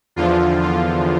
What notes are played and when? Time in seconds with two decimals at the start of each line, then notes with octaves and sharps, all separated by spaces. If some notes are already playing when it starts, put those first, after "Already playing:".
0.16 E2 D3 F3 F4
0.62 F4